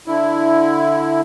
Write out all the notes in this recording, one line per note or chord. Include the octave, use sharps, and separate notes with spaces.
D3 E4